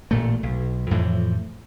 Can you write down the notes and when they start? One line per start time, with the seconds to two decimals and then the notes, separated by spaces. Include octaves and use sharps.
0.11 A1 A#2 A3
0.43 B1
0.91 F2 A2 E3 F3